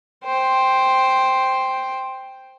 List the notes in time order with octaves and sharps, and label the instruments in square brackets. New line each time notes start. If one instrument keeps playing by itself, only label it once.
[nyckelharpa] C5 G5